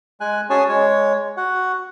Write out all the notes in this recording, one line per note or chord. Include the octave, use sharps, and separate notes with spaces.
G#3 G#5 F#6
C#4 F#4 G#4 C#5 G#5 A5
G#3 C#5
F#4 F#5